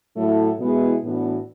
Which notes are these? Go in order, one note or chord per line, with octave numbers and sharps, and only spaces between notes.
A2 F#3 A3 E4 A4
B2 G#3 B3 E4 G#4
A2 E3 B3 D4 F#4